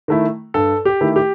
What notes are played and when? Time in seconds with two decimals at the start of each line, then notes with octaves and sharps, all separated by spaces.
0.08 D#3 A3 E4
0.54 G2 A4
0.85 G4
1.01 D#3 A3 E4
1.16 G4